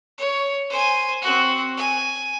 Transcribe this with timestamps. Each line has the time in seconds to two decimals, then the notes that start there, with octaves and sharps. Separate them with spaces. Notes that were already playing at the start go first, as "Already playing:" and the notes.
0.18 C#5
0.70 C5 G#5
1.22 C4 F#4
1.77 G#5